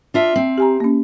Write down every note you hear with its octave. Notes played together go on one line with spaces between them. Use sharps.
D4 F4 E5
C4
G4 G#5 A#5
A#3 C#4